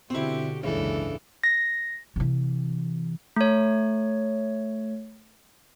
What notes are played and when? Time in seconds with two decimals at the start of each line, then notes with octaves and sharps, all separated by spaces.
0.10 B2 D3 C4 E4 F#4 G4
0.63 F#1 C#2 G#2 C#3 E3 D4 A4
1.44 A#6
2.16 C3 E3
3.36 A3 C#5